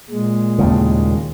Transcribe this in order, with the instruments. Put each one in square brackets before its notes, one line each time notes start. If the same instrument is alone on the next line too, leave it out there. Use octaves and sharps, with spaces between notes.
[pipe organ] A#2 G#3
[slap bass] D#2 A2 C#3